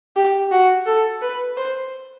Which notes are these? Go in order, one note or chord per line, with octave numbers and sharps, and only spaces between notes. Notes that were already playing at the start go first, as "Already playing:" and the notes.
G4
F#4
A4
B4
C5